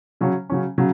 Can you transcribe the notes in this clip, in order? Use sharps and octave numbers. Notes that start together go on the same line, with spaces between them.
C#3 F#3 C#4
C#3 F#3 C#4
C#3 F#3